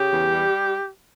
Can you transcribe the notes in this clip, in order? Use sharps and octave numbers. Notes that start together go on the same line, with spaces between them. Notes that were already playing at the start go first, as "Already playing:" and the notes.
Already playing: C#3 G4
E2
G3